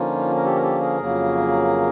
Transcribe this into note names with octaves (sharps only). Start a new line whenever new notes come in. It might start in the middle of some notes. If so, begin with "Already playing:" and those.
Already playing: D3 F3 A#3 C#4 D#4 F4
A#4
G4 A4
A#4
G4 A4
G#4 A#4
F2 C#3 F#3 A#3